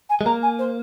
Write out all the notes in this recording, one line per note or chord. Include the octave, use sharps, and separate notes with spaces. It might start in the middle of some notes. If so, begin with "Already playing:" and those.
G#5
G#3
A#3 A#5
G#5
C5